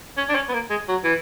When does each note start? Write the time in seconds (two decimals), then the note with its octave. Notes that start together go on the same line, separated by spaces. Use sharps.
0.17 C#4
0.29 D4
0.35 C#4
0.49 B3
0.53 A#3
0.70 G#3
0.88 F#3
1.04 E3